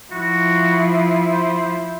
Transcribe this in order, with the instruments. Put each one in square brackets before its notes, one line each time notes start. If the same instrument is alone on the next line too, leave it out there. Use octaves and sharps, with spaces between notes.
[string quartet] F3 E4 [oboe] F#4
[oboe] C5